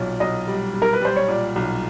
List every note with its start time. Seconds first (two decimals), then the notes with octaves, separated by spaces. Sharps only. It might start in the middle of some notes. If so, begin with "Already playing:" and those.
Already playing: B1 A#2
0.20 B1 D#5
0.48 G3
0.74 G3
0.82 A#4
0.93 B4
1.01 G3 C5
1.16 C#5
1.28 A#2 D5
1.56 B1